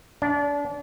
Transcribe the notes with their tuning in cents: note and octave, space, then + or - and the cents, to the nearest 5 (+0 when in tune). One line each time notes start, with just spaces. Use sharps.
D4 -30